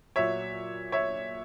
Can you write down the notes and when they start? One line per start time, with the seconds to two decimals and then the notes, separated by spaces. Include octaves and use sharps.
0.16 A#2 F#3 C#5 E5
0.92 C#5 E5